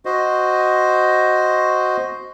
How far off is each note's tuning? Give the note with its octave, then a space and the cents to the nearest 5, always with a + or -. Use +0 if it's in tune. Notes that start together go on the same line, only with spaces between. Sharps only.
F#4 +0 C5 +0 D#5 +0